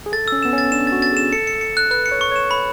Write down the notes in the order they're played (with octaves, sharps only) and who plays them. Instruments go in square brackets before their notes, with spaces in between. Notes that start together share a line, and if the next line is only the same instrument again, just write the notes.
[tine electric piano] G#4
[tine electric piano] A4 [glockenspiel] A6
[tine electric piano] C#4 [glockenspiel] E6
[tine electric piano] B3 [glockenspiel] E7
[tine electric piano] C#4
[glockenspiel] A6
[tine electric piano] D4 [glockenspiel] E7
[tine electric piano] F#4 [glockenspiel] A6
[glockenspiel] A6
[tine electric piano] G#4 [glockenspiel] E7
[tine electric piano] A4 [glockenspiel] C#7
[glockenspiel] C#7
C#7
F#6
[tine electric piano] B4 [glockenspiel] F#6
[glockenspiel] C#7
[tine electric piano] C#5
[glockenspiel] C#6
[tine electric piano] C#5 [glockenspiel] E7
[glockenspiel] B5